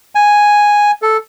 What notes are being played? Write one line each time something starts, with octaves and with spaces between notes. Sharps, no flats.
G#5
A4